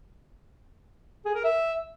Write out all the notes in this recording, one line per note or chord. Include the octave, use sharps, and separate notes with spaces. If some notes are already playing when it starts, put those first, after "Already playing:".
G#4
A#4
E5